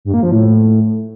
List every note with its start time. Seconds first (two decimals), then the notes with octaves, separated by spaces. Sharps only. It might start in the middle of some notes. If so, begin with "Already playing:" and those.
0.05 G2
0.14 A#3
0.23 F3
0.32 A2